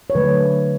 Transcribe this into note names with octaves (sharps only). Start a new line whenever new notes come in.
C#5
D3 F#3 A3 B4